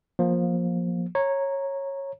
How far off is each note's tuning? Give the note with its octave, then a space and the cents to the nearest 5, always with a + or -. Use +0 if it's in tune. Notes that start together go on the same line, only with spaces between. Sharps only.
F3 +15 A#3 +20
C#5 -15 A#5 +0